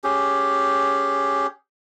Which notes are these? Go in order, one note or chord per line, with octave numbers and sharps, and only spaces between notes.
C#4 G4 G#4